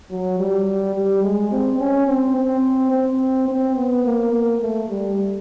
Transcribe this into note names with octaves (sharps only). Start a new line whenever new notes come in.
F#3
G3
G3
G#3
C4
C#4
C4
C4
C4
C4
B3
A#3
A#3
A3
G3